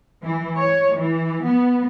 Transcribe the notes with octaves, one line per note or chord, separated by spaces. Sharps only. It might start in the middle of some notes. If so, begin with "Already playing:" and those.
E3
C#5
E3
B3